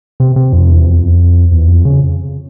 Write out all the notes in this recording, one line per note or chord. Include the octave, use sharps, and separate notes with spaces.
C3
C3
F2
E2
F2
E2
F2
C#3